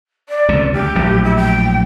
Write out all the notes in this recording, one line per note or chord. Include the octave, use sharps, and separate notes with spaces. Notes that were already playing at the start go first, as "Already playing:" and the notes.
D5
C#2 C3
D2 G4
A#1 A2 F#3
E4
G5